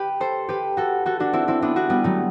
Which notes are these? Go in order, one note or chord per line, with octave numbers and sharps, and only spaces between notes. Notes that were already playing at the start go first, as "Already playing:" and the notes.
Already playing: G4 B4
A4 C5
G4 B4
F#4 A4
F#4 A4
D4 F#4
C4 E4
C4 E4
B3 D4
D4 F#4
G3 B3
F#3 A3